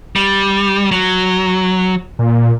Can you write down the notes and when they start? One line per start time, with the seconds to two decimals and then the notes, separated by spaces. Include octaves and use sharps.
0.16 G3
0.91 F#3
2.19 A#2